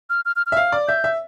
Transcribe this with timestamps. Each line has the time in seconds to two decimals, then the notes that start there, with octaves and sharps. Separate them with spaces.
0.10 F6
0.25 F6
0.36 F6
0.46 F6
0.52 E5
0.57 F5
0.72 D5
0.88 E5 G6
1.04 E5